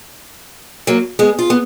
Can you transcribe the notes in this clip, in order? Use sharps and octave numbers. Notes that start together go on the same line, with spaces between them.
F#3 A#3
G#3 B3
F4
B3